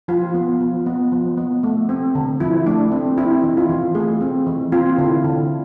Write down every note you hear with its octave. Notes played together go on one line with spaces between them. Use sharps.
F3 F4
B3
F3
B3
F3
B3
A3
C4
D3
F3 E4
A3 D4
C4
C4 E4
E3
F4
E3
A3 G#4
C4
E3
C4 F4
D3 E4
D3